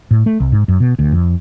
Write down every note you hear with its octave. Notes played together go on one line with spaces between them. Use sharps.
A2
A3
C2
G#2
F#2
B2
D2
F2